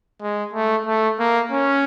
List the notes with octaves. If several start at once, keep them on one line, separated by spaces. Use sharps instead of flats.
G#3
A3
A3
A#3
C#4